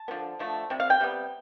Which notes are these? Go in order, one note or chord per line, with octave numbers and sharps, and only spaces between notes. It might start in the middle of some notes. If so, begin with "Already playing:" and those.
Already playing: A5
B3
D3 F3
D3 F3 A3
C3 G3
F5
G5
C3 G3 B3